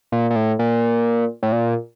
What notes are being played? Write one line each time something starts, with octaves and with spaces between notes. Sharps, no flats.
A#2
A#2
A2
A#2
A2
A#2